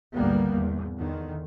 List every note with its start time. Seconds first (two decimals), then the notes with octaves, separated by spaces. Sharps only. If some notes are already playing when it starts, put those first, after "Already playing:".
0.14 G#1 D2 D3 G3 A#3 B3
0.54 E2
0.98 E2 D3 D#3